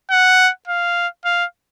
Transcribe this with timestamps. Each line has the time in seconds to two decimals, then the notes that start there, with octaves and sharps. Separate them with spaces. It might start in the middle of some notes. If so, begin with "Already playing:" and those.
0.11 F#5
0.68 F5
1.25 F5